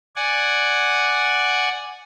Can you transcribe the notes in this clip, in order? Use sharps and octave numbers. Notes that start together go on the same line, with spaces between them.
D5 F#5 G#5